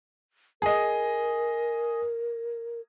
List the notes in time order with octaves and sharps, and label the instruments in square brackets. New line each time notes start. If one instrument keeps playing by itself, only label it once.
[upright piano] G#4 D#5 [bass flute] A#4